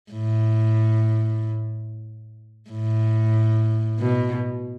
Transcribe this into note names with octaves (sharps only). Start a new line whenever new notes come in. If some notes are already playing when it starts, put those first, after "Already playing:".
A2
A2
B2